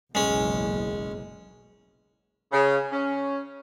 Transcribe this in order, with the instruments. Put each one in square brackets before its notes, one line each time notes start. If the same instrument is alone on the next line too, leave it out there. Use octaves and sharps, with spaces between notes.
[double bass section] F#1 B1 E2 [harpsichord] G#3 C#4
[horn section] C#3
C#4